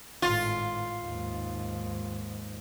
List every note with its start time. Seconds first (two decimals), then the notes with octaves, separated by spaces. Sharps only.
0.22 G#1 A2 F4
1.03 D#2 G#2